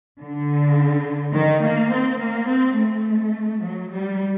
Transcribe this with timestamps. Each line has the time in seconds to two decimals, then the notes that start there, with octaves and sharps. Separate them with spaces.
0.21 D3
1.35 D#3
1.63 A#3
1.92 C4
2.20 A#3
2.48 C4
2.77 A3
3.63 F#3
3.91 G3